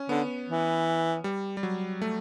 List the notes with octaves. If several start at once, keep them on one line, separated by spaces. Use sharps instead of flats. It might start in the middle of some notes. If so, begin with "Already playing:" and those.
Already playing: C#4
D3 B3
E3
G3
G3
F#3
A3